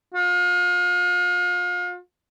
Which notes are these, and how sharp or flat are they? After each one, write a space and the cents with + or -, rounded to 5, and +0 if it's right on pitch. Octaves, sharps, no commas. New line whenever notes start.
F4 +35